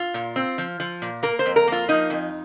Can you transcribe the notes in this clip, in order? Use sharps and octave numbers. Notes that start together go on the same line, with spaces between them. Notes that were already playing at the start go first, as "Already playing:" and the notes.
Already playing: F4
A#2
C4
F3
F3
A#2
A#3 A#4
C5
F2
A#4
A#3 F4
F3 D#4
F2